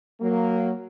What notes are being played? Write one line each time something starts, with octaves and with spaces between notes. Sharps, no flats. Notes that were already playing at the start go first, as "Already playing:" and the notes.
F#3 A#3